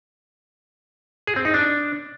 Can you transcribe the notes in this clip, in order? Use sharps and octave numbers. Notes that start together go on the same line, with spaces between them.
G#4
C4
D#4
D4